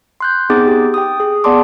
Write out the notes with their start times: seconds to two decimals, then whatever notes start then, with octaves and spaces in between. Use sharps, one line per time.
0.20 C6 F#6 G6
0.50 B3 C4 D#4 G#4 D6 A6
0.67 G4
0.94 G5 D#6
1.20 G#4 D#6
1.44 B3 G#4 D5 A5 C6 D6